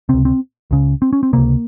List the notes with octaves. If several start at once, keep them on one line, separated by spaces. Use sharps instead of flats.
C#2 C3 C4
C4
C#2 C#3
C4
C#4
C4
C#2 C3 A#3